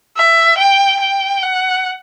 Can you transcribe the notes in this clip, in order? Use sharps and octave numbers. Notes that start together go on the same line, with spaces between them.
E5
G5
G5
F#5